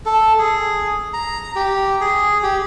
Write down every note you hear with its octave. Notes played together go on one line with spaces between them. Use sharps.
A4
G#4
A#5
G4
G#4
G4